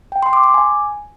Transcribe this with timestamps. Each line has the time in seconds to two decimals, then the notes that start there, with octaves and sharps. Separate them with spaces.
0.12 G5
0.23 C6
0.33 D6
0.44 D6
0.54 G#5